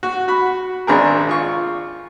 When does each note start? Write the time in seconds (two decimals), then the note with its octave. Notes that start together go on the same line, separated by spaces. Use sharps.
0.03 F#4
0.28 F#4 B5
0.87 G#1 D4 G#4 A#4
1.29 F4 C#6